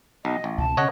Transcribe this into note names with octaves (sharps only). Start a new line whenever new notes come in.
B1 D#5
A1
C#2 B2 A5
C#3 C#5 D#5 F#5